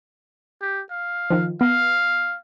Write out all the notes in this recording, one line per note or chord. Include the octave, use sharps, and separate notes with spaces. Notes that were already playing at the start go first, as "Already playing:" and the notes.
G4
F5
D#3 F3
B3 F5